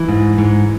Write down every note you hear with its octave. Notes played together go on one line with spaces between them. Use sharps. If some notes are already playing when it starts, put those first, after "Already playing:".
Already playing: E3
G#2
G#2